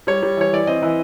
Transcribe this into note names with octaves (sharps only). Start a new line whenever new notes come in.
G3 C#5
G3
E3 C#5
E3 D5
C4 D#5
E3